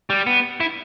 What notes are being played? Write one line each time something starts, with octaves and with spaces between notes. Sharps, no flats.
G3
B3
E4